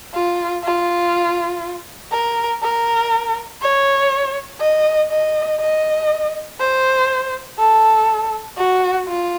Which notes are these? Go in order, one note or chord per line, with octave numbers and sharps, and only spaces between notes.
F4
F4
A#4
A#4
C#5
D#5
D#5
D#5
C5
A4
F#4
F4